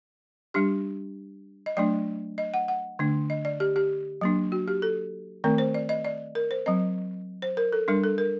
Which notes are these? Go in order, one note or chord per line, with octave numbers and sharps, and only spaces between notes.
G3 D4 G4
D#5
F#3 A3 D4 D5
D#5
F#5
F#5
D3 A3 D4
D#5
D5
G4
G4
F#3 A#3 D4
F#4
G4
A4
D#3 A3 C4 A#4
C5
D5
D#5
D5
A#4
C5
F#3 C4 D#5
C5
A#4
A4
G3 D4 A#4
A4
A#4